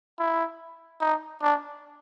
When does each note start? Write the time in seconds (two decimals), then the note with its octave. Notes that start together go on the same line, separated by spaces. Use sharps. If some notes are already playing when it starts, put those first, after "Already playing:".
0.19 E4
1.01 D#4
1.42 D4